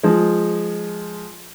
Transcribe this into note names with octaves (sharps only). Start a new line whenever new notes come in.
F3 G#3